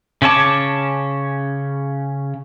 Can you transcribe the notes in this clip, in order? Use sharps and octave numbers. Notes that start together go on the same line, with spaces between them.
C#3 C#4 C#5 A5 D6